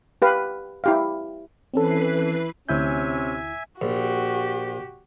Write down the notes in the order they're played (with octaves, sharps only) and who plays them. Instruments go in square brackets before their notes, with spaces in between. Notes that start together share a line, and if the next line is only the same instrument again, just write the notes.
[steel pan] G4 B4 F5
E4 G4 F5
[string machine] E3 B4 C7 [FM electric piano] C4 C#4 A4
[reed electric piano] D2 E4 G6 [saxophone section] C3 C#4 [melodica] E5 G#5
[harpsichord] A#1 [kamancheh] F#4 G4